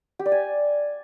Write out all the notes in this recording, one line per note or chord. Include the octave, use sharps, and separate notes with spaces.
G4
D5
G#5